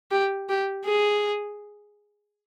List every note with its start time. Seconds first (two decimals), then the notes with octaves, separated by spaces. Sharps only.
0.11 G4
0.49 G4
0.85 G#4